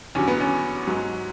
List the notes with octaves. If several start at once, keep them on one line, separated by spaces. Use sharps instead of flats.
E2 D3 F#3 C#4
B3
C#4
G#2 F#3